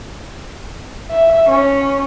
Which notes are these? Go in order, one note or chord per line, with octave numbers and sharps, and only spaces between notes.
E5
C#4